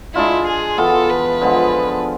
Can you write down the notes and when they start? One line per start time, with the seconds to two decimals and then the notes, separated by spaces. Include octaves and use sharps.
0.14 G#3 D4 E4 F4
0.47 G#4
0.78 E3 B3 F4 A4
1.09 B4
1.41 D3 F3 G#3 B3